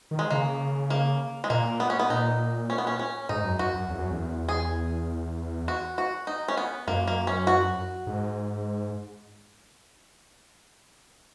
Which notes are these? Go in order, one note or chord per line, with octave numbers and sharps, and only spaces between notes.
D#3
G#3
C#3 A#3
A#3
G#3
A#2 A#3
B3
C#4
B3
A#2 D#4
C#4
B3
C#4
C#4
G#2 D#4
F#2
F#2 F#4
F#2
E2
F#2
E2
G#4
F#4
F#4
D#4
C#4
B3
F#2 A#3
A#3
C#4
F#4
G#2